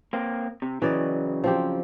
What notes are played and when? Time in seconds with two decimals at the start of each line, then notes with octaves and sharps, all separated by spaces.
0.13 A#3 C4
0.62 C3
0.82 C#3 E3 F#3 D5 D#5
1.44 F3 C4 G4